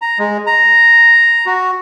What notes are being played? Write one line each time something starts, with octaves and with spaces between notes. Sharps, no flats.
A#5
G#3
A#5
F#4